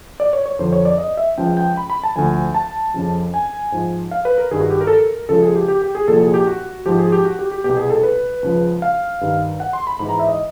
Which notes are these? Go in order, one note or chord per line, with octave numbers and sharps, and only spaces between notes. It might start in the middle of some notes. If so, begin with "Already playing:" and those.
D5
C#5
C#5
F2 D3 F3 C5
C#5
D5
D#5
E5
C#2 C#3 F3 G5
G5
B5
B5
A5
D2 D3 F3 G#5
A5
F2 C#3 F3
G#5
G#2 F3
F5
B4
A#4
G2 D#3 G#4
F#4
G4
A#4
A4
A#4
C#2 C#3 F3 A4
G#4
G4
G4
G4
G#4
C2 A#2 F3 A4
G#4
G4
F#4
G#2 F3 G4
G#4
G4
F#4
G4
G4
C2 B2 G4
G#4
A4
B4
C#2 C#3 F3
F5
G2 D#3
F#5
C6
B5
G#2 E3 B5
A#5
E5
D#5